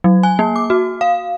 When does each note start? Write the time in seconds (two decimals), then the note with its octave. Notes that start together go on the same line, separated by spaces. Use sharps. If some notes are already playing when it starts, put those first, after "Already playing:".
0.04 F#3
0.23 G#5
0.39 A#3
0.56 D6
0.70 F#4
1.01 F5